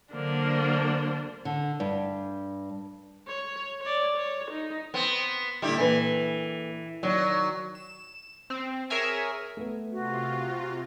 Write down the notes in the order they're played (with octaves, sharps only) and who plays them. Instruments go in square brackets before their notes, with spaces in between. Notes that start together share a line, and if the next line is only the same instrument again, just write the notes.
[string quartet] D3 F#3 A#3 D4 C5
[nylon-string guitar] D3
G2
[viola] C#5
C#5 D5
C#5
D#4
[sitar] B3 C4
[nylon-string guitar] A#2 G3 [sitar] D3 E4 G4
[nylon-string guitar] A#2 A4 B4 [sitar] E3
[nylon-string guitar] D#3 D5 [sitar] F#3
[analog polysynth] E7
C4
G#4 A#4 C#5 E5 G#5
[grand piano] A3 B3
[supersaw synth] C3 F4 [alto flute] F#4